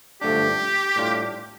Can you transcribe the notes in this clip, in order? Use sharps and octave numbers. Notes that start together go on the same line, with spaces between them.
G2 D3 F3 A3 D4 G4
A2 G3 D4 F4